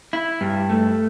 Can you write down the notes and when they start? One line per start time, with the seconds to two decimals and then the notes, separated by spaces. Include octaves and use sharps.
0.13 E4
0.41 G2
0.69 A3